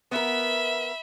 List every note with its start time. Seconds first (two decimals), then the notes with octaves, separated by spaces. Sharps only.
0.11 B3 A#4 E5 B5